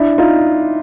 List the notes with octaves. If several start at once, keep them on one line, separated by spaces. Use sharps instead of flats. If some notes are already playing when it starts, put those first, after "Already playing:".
Already playing: D4 E4
D#4 F4